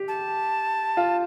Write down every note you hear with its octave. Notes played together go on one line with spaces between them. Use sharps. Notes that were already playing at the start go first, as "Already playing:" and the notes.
Already playing: G4
A5
F4